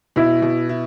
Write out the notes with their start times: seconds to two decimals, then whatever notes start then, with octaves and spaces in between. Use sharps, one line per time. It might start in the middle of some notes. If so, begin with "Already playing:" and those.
0.16 B2 E4
0.42 B2
0.69 E4